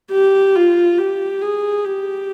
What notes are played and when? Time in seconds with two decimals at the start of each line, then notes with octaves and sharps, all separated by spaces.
0.11 G4
0.55 F4
0.98 G4
1.41 G#4
1.84 G4